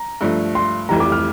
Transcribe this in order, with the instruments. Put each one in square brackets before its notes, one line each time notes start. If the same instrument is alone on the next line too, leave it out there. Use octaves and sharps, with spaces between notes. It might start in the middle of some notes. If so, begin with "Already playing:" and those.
Already playing: [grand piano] A#5
[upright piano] G2 F3 A3
[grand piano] C6
[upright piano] F1 F2 E3 G3 [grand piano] A#5
[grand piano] D6
F6